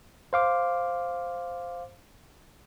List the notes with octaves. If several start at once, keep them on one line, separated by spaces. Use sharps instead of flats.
C5 F5 D6